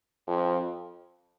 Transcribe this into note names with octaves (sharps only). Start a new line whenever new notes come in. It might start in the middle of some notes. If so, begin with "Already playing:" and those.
F2